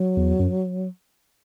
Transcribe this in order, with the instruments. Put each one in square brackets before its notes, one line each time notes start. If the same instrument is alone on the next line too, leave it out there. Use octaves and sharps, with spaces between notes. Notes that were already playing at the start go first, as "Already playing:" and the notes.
Already playing: [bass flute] F#3
[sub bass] E2
F#2